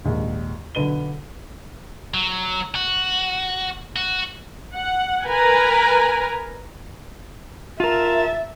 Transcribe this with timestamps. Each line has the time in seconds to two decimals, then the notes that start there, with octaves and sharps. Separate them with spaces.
0.04 A#1 D#2 G#2
0.75 B1 D3 B4 D#7 G7
2.14 F#3
2.75 F#4
3.96 F#4
4.73 F#5
5.26 A#4 B4 G#5 A#5
7.80 F4 A#4 E5 A5